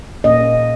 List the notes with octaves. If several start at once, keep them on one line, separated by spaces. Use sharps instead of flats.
A#2 A#3 C#4 D#5